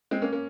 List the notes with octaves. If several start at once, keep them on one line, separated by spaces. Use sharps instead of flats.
G#3 C4
A#3 C#4
A#3 C#4